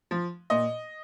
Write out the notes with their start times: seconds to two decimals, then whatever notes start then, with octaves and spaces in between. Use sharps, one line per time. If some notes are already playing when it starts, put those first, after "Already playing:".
0.11 F3
0.50 A#2 D#5